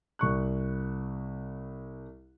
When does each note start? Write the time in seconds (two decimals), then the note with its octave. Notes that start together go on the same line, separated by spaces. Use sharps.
0.19 C2 C#6 F#6